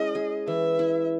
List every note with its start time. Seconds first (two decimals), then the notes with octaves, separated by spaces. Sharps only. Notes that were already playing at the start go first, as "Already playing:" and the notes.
Already playing: G#3 C#4 E4 D#5
0.15 G#4
0.47 E3 E5
0.79 E4